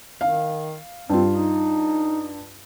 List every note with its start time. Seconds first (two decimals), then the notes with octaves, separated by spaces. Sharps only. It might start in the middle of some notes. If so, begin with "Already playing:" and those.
0.21 D#3 F5
1.09 G2 C4 F4
1.31 D#4